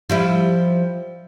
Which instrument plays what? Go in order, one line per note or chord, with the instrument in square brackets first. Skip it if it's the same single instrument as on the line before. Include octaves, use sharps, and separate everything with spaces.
[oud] F3 G3 E4